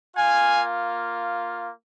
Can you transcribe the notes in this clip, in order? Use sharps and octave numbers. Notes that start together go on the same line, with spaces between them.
A#3 F4 F5 G#5